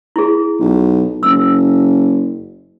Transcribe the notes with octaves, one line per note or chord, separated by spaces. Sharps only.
E4 G#4
B1
F#1 E6